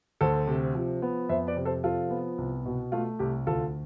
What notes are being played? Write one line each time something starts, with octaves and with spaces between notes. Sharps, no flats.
D2 A4 C5
C3
F3
B3
F2 C5 E5
B4 D5
C3
A4 C5
F3 F4 A4
B3
C2
B2
A3 F4
C2 G4
D2 F4 A4